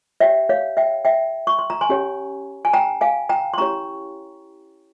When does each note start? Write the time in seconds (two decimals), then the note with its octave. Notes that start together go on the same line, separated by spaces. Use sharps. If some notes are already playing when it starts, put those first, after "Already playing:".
0.20 G4 C#5 E5 G5
0.49 C#5 F5
0.77 E5 G5
1.05 E5 G5
1.47 C#6
1.59 C6
1.70 A#5
1.81 G#5 C6
1.89 C#4 G4 C#5
2.65 G#5
2.73 G5 A#5
3.01 F5 G#5
3.29 G5 A#5
3.54 C6
3.58 C#4 E4 G4 C#5 A#5 C#6